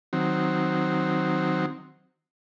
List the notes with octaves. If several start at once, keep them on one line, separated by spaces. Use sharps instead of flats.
D#3 F#3 C4